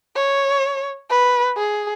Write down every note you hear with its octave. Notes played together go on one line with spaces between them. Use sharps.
C#5
B4
G#4